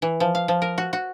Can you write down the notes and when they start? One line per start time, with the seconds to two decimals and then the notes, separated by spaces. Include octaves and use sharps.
0.02 E3
0.20 F3
0.35 F5
0.48 F3
0.62 A#4
0.78 F#4
0.93 F#4